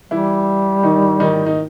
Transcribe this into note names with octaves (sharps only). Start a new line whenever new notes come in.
E3 G3 E4
D#3 D#4
D#3 D#4
D#4